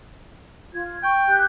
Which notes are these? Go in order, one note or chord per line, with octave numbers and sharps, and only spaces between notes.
F4 G#6
G5 C#6
G4 F#6 G6